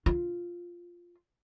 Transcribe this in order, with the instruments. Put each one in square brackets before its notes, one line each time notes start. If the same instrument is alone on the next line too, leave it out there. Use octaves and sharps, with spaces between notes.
[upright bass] F4